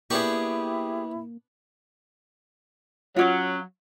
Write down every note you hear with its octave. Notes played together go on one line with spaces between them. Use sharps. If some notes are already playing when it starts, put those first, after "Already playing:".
A#3 B3 D4 E4 G4 G#4 C#6
F#3 C#4 D4 F4